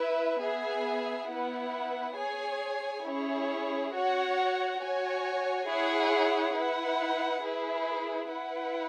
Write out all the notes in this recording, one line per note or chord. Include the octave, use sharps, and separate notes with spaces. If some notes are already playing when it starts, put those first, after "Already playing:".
Already playing: E4 B4 E5
B3 G#4 E5 G#5
B3 E4 B4 F#5
G#4 C#5 G#5
C#4 E4 G#4 C#5
F#4 C#5 F#5
F#4 C#5 G#5
E4 G#4 C#5 F#5
E4 B4 F#5
E4 G#4 B4
E4 B4 F#5